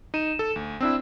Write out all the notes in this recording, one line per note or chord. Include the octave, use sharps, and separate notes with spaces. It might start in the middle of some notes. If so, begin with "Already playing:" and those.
D#4 D#7 E7
A4
D2
C4 D4 E4 E6